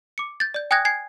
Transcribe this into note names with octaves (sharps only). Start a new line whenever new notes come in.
D6 C#7
G6 A6
D5 G6
G5 G#5 D#6 F#6 G#6 A#6
G#5 G#6 C7